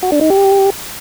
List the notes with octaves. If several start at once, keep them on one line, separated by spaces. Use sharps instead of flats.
F#4
D4
D#4
G4